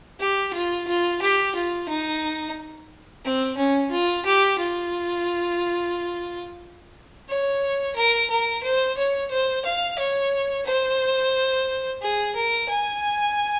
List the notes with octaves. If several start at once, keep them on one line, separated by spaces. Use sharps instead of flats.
G4
F4
F4
G4
F4
D#4
C4
C#4
F4
G4
F4
C#5
A#4
A#4
C5
C#5
C5
F5
C#5
C5
G#4
A#4
G#5